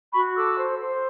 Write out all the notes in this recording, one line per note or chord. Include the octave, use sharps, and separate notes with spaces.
F#4 B5 C#6
A4 D6 E6
C5
C5